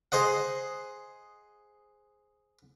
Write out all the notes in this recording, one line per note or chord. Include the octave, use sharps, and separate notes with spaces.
G#4 C5 D#5 F#5